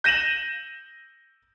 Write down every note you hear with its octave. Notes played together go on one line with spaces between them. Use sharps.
G6 A#6 D#7 E7 F#7